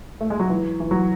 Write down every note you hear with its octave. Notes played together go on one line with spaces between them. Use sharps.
A3
G#3
F#3
E3
E3
F#3